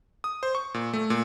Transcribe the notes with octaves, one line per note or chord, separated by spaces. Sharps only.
D#6
C5
C#6
A#2
A3
A#2